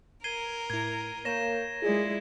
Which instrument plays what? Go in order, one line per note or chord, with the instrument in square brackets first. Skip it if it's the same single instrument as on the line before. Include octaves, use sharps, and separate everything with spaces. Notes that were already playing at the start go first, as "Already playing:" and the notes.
[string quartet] A#4 [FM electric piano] G#6 [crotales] C7 D#7 G7
[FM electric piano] A2 E4 [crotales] G#6
[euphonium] A#3 [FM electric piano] C#5 A#5 G6 [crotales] A#6 E7
[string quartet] G#3 E4 [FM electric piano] F4 D5 [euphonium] G#4